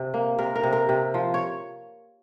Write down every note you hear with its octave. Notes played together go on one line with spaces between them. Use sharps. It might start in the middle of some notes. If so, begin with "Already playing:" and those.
Already playing: C3 C4
A#3
C3 A#4
A#4
C3
A#4
C3
F3
C#5